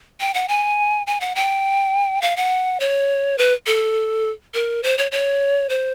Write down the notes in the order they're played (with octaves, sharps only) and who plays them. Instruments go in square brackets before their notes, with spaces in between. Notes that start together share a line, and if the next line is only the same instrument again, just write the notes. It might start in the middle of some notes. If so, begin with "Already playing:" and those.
[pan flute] G5
F#5
G#5
G#5
F#5
G5
F5
F#5
C#5
B4
A4
A#4
C5
C#5
C#5
C5